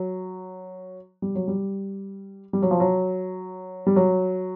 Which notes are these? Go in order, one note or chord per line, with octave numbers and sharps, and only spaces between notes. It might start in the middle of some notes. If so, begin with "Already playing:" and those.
Already playing: F#3
G3
F#3
G3
G3
F#3
F3
F#3
G3
F#3